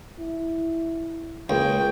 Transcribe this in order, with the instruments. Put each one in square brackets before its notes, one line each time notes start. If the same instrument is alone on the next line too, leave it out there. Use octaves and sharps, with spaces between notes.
[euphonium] E4
[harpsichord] C#2 [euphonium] A#3 [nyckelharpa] G5